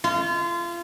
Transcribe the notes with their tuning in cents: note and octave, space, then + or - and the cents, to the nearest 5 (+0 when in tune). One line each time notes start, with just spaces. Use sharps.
F4 -30